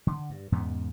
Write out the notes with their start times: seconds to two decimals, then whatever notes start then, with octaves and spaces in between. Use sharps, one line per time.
0.07 D3
0.30 G2
0.52 E2 G#2 C#3 B3